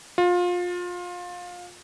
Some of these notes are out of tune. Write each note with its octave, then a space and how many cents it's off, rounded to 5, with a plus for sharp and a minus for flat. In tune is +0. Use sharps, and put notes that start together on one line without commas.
F4 +25